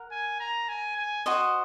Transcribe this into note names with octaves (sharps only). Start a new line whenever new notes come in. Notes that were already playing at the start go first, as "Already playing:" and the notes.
Already playing: A#4 F#5
G#5
A#5
G#5
G#5
F#4 C5 D#5